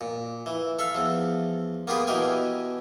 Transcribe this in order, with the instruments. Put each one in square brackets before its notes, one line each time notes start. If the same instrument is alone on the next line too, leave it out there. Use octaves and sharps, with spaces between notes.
[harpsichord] A#2
E3
A4 E5 F5
E2 F3
A#3 B3 F4 G4 G#4 B4
B2 E3 G4 A#4 G#5